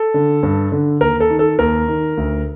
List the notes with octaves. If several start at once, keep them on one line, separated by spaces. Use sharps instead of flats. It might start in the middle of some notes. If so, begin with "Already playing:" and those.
Already playing: A4
D3
G2
D3
D#2 A#4
A4
D#3
A4
D#2 A#4
D#3
D2